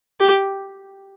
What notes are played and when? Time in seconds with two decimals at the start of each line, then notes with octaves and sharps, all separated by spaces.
0.20 G4